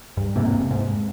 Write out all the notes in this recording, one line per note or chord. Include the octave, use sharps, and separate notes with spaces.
G2
E1 G#2 C3 A#3
G#2